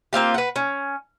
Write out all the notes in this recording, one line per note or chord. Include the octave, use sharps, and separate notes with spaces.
A#3 C4 F4 G4
B4 F#5
C#4